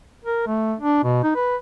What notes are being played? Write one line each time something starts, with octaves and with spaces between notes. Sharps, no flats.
A#4
A3
D4
B2
D#4
B4